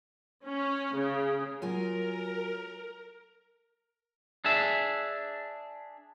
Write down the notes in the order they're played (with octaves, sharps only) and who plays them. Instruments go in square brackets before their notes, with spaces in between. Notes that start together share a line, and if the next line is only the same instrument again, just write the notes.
[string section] C#4
C#3
[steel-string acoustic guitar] F#3 F4 G#5 [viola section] A#4
[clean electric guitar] D4 G#4 E5